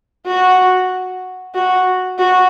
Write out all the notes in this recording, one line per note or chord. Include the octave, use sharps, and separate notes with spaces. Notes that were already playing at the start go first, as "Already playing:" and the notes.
F#4
F#4
F#4